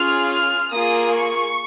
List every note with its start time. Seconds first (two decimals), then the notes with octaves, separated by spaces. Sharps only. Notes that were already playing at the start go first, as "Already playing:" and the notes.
Already playing: C#4 F4 G#4 F6
0.31 F6
0.72 A#3 F4 G#4 D#6
1.13 C#6